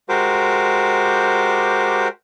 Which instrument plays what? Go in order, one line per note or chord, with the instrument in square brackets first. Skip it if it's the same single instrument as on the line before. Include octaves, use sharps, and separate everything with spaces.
[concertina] G#3 F#4 G4 A#4 C5 D6